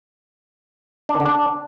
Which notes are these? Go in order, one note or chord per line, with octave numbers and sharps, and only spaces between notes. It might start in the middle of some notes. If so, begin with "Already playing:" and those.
D4
D#3
D3
D4